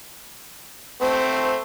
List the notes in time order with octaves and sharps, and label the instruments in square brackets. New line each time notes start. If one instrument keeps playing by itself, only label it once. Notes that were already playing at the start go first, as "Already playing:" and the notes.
[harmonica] A3 C4 [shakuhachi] C5